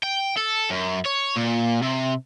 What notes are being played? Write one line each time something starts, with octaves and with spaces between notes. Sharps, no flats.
G5
A4
F#2
C#5
A#2
C3